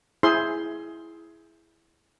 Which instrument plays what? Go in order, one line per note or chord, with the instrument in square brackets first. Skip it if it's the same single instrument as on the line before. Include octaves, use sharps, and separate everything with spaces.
[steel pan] E4 G#4 C5 C6